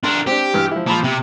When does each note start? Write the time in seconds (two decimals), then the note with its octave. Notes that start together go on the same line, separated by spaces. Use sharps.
0.04 D4 A#4 C6
0.27 C4 D4 G4
0.54 G2 E3 F6
0.71 F3 E4
0.86 A#2 F3 A#5 B5
1.03 C3